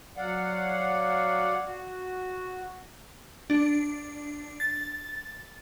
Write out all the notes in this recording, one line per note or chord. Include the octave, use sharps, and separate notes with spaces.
F#3 D5 F5 F#5
F#4
D4
A6